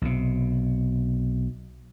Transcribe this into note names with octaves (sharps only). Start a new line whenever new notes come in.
B1 C3